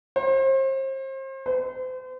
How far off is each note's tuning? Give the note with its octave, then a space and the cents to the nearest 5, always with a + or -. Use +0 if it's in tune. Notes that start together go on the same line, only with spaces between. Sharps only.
C5 +35
C5 -40